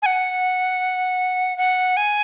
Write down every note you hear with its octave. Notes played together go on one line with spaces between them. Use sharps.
G#5
F#5
F#5
G#5